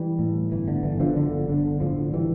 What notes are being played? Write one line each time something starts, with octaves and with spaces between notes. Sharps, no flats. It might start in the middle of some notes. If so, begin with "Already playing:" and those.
Already playing: E3 G3
A2
G1 E3
D3
G1 E3
D3 F3
G1 D3
G1 D3
A2 D3 F3
A2 E3 G3